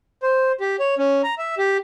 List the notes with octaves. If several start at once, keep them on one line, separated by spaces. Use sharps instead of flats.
C5
G4
C#5
C#4
A#5
E5
G4